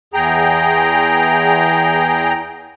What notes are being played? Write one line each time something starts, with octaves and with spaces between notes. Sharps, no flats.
E2 G#4 G5 A#5